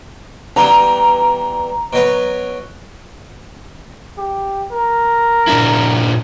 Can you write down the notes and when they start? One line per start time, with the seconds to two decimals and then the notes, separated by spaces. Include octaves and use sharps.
0.56 E3 G3 B3 A#5
1.93 B2 F#3 B4
4.18 G4
4.71 A#4
5.47 A#2 D4 E4